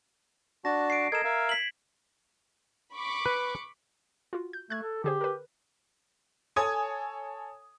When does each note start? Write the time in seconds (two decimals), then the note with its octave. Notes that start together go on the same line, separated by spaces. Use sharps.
0.65 D4 F#4 A5 A#6
0.90 C7 D7
1.12 A4 A#4 D#5 G#6 E7
1.24 A#4 E5 F5
1.49 B6 F#7
2.94 B5 C#6 D6
3.26 B4
4.33 F4 F#4
4.53 G6
4.70 A3 F#6 G#6
4.83 A4
5.04 D3 G4 G#4 C5
5.21 A#4 B4
6.56 A4 C#5 G#5 D#6 G#6